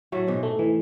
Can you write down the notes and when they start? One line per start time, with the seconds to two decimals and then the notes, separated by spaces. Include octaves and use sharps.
0.12 A2 F#3 A3
0.27 G#2 B2 G#3
0.43 A3
0.59 E3